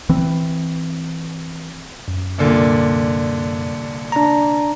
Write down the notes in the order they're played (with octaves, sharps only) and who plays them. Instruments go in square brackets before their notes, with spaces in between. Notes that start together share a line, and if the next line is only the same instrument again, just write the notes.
[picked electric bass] E3 C4
[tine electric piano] F#2
[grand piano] C2 A#2 D3
[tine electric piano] D4 A#5